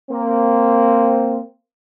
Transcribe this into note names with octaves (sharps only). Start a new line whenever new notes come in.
A#3 C4